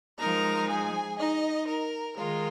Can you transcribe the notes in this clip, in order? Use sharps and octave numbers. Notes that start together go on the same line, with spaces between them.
F3 G#3 D#4 A#4 A#5
G#4 G#5
D#4 D#5
A#4
D#3 G#3 F4 A#4